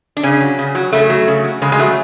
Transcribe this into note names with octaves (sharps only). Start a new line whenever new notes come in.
D4
C#3 C#4
F#3
C#3
F#3
C#3 A3
F#3
C#3
F#3
C#3 G#3
G#3
F#3 A3